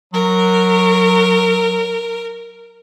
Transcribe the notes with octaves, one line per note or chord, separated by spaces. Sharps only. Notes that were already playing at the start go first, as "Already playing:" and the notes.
F#3 A#4